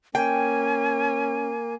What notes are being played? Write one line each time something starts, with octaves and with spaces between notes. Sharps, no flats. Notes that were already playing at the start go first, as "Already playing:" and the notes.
A#3 C#4 G5 G#5